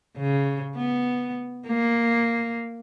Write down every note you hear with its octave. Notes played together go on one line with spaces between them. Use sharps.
C#3
B3
A#3